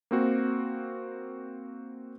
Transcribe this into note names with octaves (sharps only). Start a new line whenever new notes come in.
A#3 C4 F#4